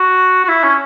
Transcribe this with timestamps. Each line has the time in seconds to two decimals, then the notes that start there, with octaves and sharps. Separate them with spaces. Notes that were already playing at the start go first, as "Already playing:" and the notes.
Already playing: F#4
0.44 F#4
0.48 E4
0.64 C#4